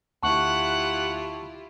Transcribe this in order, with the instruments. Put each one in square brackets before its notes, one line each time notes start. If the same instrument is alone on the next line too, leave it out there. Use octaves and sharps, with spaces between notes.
[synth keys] D2 [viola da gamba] E4 F4 G4 [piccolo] F#5 [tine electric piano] A5 C#6